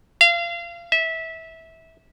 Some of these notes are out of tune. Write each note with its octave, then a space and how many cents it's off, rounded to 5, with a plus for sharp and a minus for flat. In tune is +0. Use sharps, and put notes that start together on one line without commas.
F5 -30
E5 -20